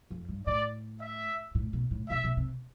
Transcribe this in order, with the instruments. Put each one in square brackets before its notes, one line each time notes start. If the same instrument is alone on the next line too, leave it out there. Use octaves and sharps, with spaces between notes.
[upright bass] F2
G2
[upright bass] A2 [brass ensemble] D5
[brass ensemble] E5
[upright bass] A2
B2
A2
[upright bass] B2 [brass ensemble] E5
[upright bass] B2
C3